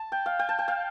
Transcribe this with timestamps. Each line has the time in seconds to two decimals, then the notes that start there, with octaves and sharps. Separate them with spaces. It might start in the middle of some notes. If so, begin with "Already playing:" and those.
Already playing: A5
0.12 G5
0.26 F5
0.39 G5
0.49 A5
0.59 G5
0.68 F5